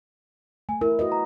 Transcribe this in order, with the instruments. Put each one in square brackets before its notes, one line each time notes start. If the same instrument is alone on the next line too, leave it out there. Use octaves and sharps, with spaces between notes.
[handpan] A3 [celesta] G#5
[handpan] E4 [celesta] A#4
[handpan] F#4 B4 D#5
[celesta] A#5